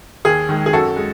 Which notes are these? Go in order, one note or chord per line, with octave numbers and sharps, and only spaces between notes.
D#2 G#4
D#3 G#3
G#4
F#2 F#4 A4
G#3